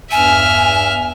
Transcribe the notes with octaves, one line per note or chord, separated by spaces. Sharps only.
E2 G2 E5 G#5 F6